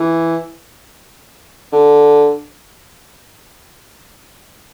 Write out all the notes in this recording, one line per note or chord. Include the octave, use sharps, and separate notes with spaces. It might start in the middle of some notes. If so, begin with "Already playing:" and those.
Already playing: E3
D3